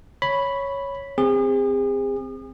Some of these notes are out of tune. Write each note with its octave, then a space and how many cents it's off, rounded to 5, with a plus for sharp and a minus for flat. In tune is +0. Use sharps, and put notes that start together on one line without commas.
C#5 +0 B5 +0
C4 -10 G#4 -40